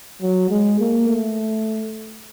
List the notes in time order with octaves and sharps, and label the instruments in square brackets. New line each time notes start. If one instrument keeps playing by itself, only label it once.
[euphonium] F#3
G#3
A#3
A3